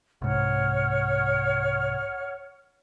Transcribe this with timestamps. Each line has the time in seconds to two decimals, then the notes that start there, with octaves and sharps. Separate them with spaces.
0.22 C2 G#2 C#5 F#5 F6